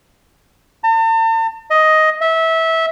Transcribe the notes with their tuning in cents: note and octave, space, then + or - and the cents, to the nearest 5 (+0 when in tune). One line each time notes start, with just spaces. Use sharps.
A5 +45
D#5 +10
E5 -20